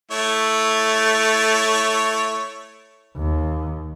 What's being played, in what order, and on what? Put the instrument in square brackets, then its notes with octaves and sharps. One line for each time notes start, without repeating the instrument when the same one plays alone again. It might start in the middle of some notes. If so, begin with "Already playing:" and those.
[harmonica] A3 E4 C#5
[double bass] D#2